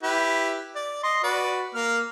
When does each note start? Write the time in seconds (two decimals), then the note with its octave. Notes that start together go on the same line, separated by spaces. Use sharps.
0.03 E4 G4 B4
0.75 D5
1.03 D#5 C6
1.23 F#4 B4 D5
1.75 A#3 F6